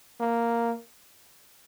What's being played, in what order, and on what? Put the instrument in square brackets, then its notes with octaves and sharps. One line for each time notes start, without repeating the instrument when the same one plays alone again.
[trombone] A#3